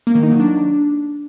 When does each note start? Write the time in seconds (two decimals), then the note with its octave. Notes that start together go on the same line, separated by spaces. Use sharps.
0.07 A#3
0.15 D#3
0.23 D#4
0.31 F#3
0.40 D4